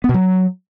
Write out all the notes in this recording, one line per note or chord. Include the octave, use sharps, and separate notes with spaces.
B3
B2
F#3